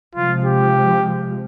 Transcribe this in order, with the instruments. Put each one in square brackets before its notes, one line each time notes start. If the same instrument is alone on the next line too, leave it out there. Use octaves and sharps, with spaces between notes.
[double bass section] C3 F3 G#3 [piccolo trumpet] F4
[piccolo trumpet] G4